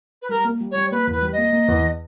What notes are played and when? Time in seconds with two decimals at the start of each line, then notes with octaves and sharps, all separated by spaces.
0.22 B4
0.29 G3 A#4
0.44 A#3
0.61 G3
0.71 G3 C#5
0.91 A#3 B4
1.07 E2 B4
1.22 G3
1.33 A#3 D#5
1.53 A#3
1.68 E2